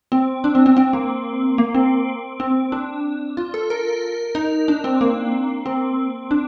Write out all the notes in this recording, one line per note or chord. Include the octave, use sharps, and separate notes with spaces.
C4
D4
C4
C4
C4
A#3
A#3
C4
C4
D4
F4
A4
A#4
D#4
D4
C4
A#3
C4
D4